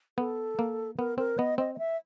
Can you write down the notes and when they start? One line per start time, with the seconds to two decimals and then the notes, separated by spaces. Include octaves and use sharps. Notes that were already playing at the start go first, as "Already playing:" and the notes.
0.18 B3 A4
0.59 A#3
0.98 B3 A#4
1.18 C4 A#4
1.38 B3 D#5
1.58 C4 D#5
1.75 D#5
1.79 E5